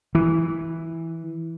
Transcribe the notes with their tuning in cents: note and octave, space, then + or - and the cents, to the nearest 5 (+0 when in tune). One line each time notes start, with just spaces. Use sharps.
E3 -5